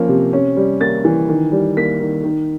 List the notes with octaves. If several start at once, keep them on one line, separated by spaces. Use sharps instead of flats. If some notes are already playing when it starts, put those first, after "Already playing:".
Already playing: F3 A#3 C#4
C3
C#4
G3
A#3 A6
E3
D#3
G3
A#3 B6
D#3
D#3